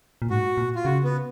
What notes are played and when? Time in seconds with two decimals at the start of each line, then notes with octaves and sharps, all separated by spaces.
0.22 A#2
0.30 G#2 F#4
0.57 A#2
0.75 F4
0.85 C#3 F#4
1.04 B3